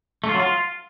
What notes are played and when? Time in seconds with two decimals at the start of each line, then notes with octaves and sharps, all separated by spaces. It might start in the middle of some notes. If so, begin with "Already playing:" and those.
0.24 A3
0.29 F4
0.34 F#3
0.40 F4